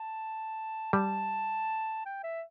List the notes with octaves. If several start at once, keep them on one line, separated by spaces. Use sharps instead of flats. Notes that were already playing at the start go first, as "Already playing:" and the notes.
Already playing: A5
G3 A5
G5
E5